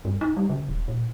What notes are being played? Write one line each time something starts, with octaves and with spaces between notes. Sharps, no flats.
G2
D#4
G3
C#3
D#1
A#2